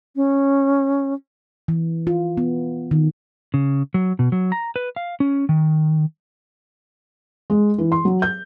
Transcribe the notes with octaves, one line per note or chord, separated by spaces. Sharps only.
C#4
E3
F4
B3
D#3
C#3
F#3
B2
F#3
A#5
B4
F5
C#4
D#3
G#3
E3
C6
F#3
G6